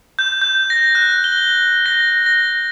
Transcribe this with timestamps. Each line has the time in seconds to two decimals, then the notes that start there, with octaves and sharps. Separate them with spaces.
0.19 G6
0.42 G6
0.70 A#6
0.95 F#6
1.24 G7
1.86 A#6
2.26 A#6